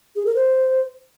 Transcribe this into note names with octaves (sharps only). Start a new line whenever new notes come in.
G#4
A#4
C5